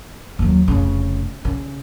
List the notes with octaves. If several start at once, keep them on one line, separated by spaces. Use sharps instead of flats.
D#2 F#3
F1 C#3
C#3